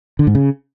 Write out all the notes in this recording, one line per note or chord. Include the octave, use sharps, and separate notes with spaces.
D3
G#2
C#3